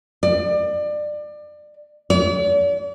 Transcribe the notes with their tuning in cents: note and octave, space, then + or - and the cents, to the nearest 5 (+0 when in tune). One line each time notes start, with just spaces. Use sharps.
D5 +25
D5 -45